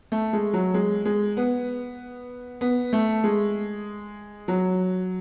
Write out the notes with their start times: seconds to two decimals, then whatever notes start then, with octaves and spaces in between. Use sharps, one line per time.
0.12 A3
0.33 G#3
0.53 F#3
0.74 G#3
1.05 G#3
1.37 B3
2.61 B3
2.93 A3
3.24 G#3
4.48 F#3